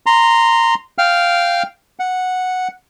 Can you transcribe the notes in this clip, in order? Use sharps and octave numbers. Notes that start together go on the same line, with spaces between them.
A#5 C6
F5 G5 F6
F#5